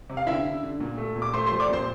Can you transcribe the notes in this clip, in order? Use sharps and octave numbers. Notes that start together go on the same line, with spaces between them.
C3
F5
D3 E4 E5
D3
D3
A#2
A3
A#2
D6
A3 C5 C6
C5 C6
F3
D5 D6
A#2 C5 C6